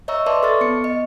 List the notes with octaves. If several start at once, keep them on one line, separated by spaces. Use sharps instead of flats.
C#5 D#5 E5 A#5 C#6 E6
B4 D5 E5 A5 C6 D6
A4 C#6 F6 A6
B3 C#7
D#5